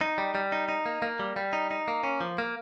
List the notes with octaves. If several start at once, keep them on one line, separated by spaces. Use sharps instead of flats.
D#4
G3
G3
D#4
D#4
A#3
A#3
G3
G3
D#4
D#4
A#3
C#4
F3
A#3